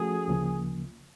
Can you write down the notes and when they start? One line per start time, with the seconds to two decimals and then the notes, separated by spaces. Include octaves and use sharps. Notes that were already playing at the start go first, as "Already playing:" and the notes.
Already playing: F3 A3 C#4 F#4 G#4 A4
0.28 D2 C#3 F3 A#3